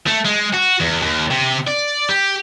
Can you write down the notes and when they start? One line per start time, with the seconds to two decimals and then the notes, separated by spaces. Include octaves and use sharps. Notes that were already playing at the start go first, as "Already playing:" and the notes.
0.07 A3
0.25 G#3
0.53 F#4
0.80 E2
1.02 D#2
1.30 C3
1.67 D5
2.09 G4